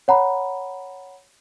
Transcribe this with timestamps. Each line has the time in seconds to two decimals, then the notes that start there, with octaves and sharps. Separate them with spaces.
0.08 C#5 F#5 A#5 B5